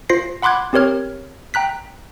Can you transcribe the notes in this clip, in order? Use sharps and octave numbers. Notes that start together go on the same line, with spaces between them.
F4 C5 A#6 C7
F#5 B5 C6 D6 F#6 G#6
C4 G4 A#4 C#5 F6 G#6
G5 A#5 F#6 B6